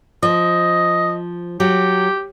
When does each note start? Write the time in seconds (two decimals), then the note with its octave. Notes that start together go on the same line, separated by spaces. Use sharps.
0.23 F3 D#5
1.60 F#3 G4